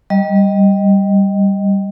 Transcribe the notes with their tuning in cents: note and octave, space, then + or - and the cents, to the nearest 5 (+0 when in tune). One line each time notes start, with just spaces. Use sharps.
G3 +0 D#5 +0